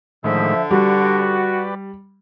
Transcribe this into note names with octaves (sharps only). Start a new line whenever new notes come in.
A2 D3 D#3 F3 G#3 E5
G3 F#4 G4 B4 D5